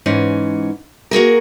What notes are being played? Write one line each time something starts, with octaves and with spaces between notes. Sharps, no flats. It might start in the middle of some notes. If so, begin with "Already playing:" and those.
G#2 E3 C#4
A#3 F#4 G#4 A#4